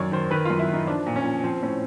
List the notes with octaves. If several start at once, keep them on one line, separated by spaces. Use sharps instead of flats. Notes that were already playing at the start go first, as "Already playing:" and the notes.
Already playing: F#2 D#3 C#5 D5
D#3 C5
D#3 B4
F#2 F4
E4
D#3
D#4
F3 D4
A#2
C#4
F3
F3 C4
A2 C#4